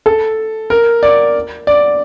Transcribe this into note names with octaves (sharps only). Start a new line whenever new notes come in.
A4
A#4
D5
D5